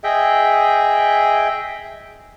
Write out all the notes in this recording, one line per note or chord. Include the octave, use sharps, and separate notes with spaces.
G#4 D#5 E5 G5